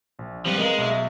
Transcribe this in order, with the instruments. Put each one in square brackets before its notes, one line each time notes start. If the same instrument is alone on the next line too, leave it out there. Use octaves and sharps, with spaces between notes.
[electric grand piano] A#1
[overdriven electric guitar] F3 B4 [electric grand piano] G3 C4
[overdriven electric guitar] G#3 [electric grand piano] A#4 F5 A#5
[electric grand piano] B1 E5